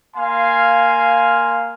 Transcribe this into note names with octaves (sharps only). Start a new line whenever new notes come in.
A#3 F5 G#5 C6